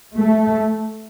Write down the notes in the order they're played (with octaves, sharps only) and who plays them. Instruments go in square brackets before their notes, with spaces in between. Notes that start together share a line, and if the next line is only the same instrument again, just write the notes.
[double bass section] A3